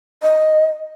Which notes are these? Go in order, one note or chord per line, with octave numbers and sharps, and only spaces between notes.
D#5